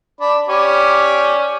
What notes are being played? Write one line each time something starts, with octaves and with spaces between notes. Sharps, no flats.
D4 B5
C#4 G4 D5